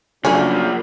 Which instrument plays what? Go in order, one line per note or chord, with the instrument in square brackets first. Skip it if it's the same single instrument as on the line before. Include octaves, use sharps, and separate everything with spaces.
[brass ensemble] C#3 F#3 [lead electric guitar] F3 A#3 [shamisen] A3 C#4 [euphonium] D4